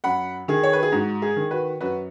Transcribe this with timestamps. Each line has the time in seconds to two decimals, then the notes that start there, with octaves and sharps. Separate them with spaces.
0.04 F#2 F#5 B5
0.48 D#3 G#4
0.63 C#5
0.73 B4
0.83 G#4
0.92 G#2 F#4
1.22 G#4
1.36 D#3
1.51 F#4 B4
1.81 F#2 F#4 B4